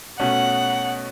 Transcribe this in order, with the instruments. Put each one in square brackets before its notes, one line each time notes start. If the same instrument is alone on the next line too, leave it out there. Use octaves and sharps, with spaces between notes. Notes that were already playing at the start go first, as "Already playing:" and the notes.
[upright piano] B2 A3 C#4 [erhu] F#5